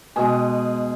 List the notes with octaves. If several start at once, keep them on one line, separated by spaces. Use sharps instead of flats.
B2 G#3 G#4